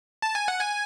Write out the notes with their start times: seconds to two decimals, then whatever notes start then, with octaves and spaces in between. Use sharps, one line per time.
0.22 A5
0.35 G#5
0.48 F#5
0.60 G#5